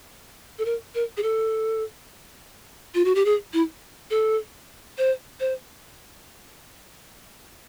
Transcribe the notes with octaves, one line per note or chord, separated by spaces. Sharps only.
A4
A#4
A#4
G#4
A4
F4
F#4
G4
G#4
E4
A4
C5
C5